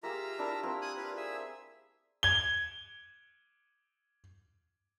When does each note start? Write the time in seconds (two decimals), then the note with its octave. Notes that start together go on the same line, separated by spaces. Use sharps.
0.03 A#3 F4 G4 G#4 E5 A#5
0.39 D4 E4 A#4
0.63 A#3 C4 C5
0.82 G#5 D#6 F#6
0.97 F4 B4
1.17 G#4 E5
2.23 G#6 G7